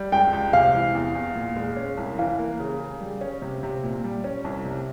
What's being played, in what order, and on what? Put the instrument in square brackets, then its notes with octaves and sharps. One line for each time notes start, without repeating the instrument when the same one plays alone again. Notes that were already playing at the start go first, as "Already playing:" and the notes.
Already playing: [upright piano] G3
[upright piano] C#2 [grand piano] G5
[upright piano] C#2
[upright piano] C3 [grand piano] F5
[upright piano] E3
E2
E2
A#2
G#3
C#4
C2
[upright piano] E3 [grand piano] F5
[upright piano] A#3
C#3
C#3
G3
C#4
C3
C3
A#2
G3
C#4
C2
C3